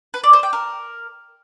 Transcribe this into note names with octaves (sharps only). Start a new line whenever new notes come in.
B4
D5
C5
G5
A#4